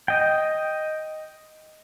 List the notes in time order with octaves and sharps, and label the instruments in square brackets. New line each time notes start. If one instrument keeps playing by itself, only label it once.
[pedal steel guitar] D#5 G5